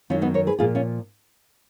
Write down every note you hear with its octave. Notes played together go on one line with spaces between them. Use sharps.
F#2 D#3 F#3 C#4 F4
B3 D#4
A#4 C#5
G#4 B4
A#2 F3 F4 G#4
C#4 F4